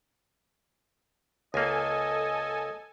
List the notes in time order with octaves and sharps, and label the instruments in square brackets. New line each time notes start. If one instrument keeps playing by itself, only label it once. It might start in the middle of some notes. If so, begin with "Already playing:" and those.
[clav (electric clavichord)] C#2 A#3 [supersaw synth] A4 G#5 [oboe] D#5